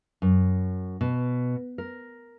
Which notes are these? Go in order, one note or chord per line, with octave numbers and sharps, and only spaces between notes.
F#2
B2
A#4